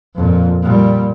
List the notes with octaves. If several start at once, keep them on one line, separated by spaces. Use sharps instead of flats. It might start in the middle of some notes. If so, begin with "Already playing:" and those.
F2 A#2
A#2 G3